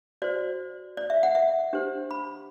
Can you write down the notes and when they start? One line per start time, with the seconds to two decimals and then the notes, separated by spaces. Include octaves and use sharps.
0.22 F#4 C5 D5
0.97 D5
1.10 E5
1.23 F#5
1.35 E5
1.73 D4 G4 C5
2.11 B5